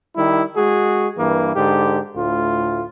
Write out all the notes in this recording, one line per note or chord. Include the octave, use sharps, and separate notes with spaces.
D#3 G3 E4
G#3 F#4 G#4
G2 E3 A#3
G#2 D3 G4
D2 A2 F4